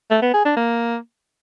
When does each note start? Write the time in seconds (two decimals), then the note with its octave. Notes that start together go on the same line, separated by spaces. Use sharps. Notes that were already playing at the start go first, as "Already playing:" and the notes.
0.10 A3
0.22 B3
0.34 G#4
0.45 D4
0.57 A#3